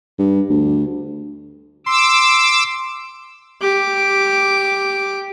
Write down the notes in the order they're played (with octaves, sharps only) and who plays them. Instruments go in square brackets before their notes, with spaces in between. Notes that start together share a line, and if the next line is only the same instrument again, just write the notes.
[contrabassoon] G2
D2
[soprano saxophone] C6 [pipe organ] D6 E6
[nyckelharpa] G4 D6